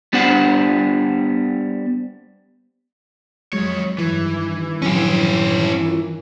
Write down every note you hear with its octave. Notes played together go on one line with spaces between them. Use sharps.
G3 B3 D4 C5 F#5
F2 D#3 F#3 G#3 C#5 B5
G2 D#3 E3
F3 F#3 C#4 D#4 G4
F4 A#4